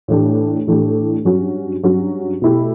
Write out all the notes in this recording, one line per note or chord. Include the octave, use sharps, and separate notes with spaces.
A2 E3 A3 D4 G4
A2 E3 A3 D4 G4
G2 F#3 C#4 F#4
G2 F#3 C#4 F#4
B2 A3 E4 G4